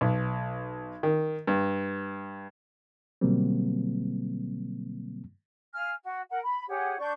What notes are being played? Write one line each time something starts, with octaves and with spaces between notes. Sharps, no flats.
B1
D#3
G2
B2 D3 F#3 G3 A#3 C4
F5 G#5 F6
F#4
A#4 F#5
B5
G4 G#4 C#5 F#5
D4 D5 C#6 G6